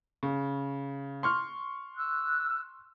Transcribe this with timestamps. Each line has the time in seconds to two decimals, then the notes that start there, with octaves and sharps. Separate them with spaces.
0.23 C#3
1.23 C6 C#6 F6
1.97 E6 F#6